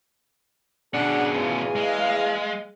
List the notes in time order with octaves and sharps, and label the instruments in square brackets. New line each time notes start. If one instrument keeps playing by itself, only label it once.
[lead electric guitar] B2 C#4 [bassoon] D4 [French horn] G#4 [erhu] F#5
[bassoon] E2 [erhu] F4
[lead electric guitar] G#3 [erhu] F5